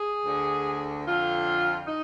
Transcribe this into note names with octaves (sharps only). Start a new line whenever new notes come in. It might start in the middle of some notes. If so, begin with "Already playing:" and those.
Already playing: G#4
D2 D3
F2 D3 F4
D#4